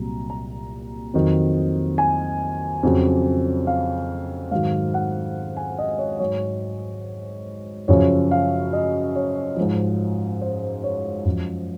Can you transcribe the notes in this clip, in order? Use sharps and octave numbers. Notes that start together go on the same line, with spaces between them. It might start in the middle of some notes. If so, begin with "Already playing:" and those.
Already playing: C2 A#2 F#3 A#5
A#5
F2 D#3 F#3
G#5
F2 C#3 F#3
F5
G#2 D#3 F#3 F5
F#5
G#5
D#5
C#5
G#2 F#3 C#5
F#2 C#3 F3 C#5
F5
D#5
C#5
G#2 F3
C5
C#5
F#2 F3